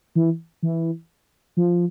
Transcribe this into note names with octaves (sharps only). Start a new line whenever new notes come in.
E3
E3
F3